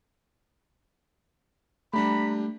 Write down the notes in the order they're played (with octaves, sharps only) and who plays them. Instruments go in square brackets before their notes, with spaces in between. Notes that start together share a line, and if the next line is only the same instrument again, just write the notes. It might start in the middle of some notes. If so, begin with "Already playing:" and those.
[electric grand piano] G3 D4 G4 [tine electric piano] A3 [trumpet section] A#5 B5